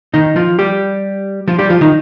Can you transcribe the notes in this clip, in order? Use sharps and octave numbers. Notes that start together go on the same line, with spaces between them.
D#3 D#4
F3 F4
G3 G4
F3 F4
G3 G4
F3 F4
D#3 D#4